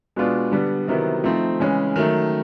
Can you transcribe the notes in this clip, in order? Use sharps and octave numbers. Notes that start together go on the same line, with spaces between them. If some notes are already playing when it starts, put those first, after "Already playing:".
B2 G#3 B3 D4 F4
D3 G3 B3
C3 D#3 F#3 B3 E4
F3 A3 C4 D#4
C#3 E3 G#3 C#4
D#3 F#3 A3